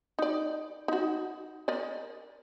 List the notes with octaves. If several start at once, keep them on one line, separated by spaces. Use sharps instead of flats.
D#4 D5
D#4 F#4
A#4 D5 D#5